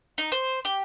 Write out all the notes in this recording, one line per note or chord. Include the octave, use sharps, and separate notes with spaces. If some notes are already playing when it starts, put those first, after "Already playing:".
D#4
C5
G4